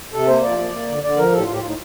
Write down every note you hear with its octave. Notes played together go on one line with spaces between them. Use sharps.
C3 A4
A#3 C5
F3 D5
A#3
A#3
D3
D3 D5
F3 A#4
A2 A4
G4
F4
A2
G4
F4
A2 D#4